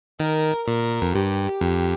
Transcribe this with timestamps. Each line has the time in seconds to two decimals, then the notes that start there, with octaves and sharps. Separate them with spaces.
0.20 D#3 A#4
0.67 A#2 A#4
1.02 F2
1.14 G2 G4
1.61 F2